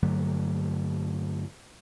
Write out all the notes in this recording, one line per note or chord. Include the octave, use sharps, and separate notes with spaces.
G2 D3 F#3 A3